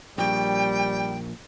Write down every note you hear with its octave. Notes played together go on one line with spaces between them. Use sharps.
A#1 G3 G5